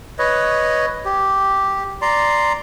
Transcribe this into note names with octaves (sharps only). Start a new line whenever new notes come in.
B4 C#5 D#5
G4
D5 A#5 C6